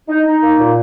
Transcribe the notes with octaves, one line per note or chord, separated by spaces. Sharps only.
D#4
D#4
A#3
A#2